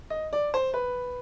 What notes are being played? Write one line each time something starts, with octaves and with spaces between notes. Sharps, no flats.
D#5
D5
C5
B4